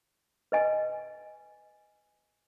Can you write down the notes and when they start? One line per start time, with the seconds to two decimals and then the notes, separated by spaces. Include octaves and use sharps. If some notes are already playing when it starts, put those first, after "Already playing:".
0.52 B4 D#5 G#5